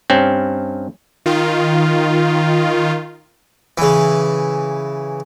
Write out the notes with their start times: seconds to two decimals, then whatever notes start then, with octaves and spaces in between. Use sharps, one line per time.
0.10 G2 C4 C#4
1.26 D#3 F4
3.78 C#3 E3